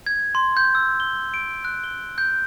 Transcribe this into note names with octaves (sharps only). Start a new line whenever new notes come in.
G#6
C6
G6
E6
G7
D7
F#6
G7
G6